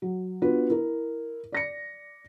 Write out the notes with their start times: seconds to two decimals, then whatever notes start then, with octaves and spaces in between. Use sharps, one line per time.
0.02 F#3
0.42 B3 D4 F4 F#4 B4
0.70 E4 A#4
1.52 D5 A#6 C#7